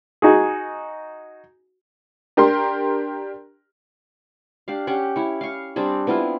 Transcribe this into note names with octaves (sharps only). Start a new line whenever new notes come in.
D#4 F#4 G#4
D4 G4 A#4 C6
D4 G4 F5
C#4 G4 F#5
E4 C#5
F5 C#6
G3 C4 D4 G#4
B3 C4 E4 F4